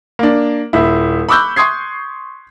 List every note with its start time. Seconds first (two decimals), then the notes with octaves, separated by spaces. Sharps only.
0.19 A#3 D4
0.73 D#1 E4
1.29 B5 C#6 D6 E6 F#6 G6
1.56 C6 C#6 D#6 G#6 C7